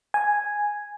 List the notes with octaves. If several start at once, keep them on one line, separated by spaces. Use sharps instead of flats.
G#5